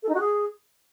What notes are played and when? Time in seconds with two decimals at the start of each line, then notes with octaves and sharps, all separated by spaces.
0.03 A4
0.09 D#4
0.14 F#4
0.20 G#4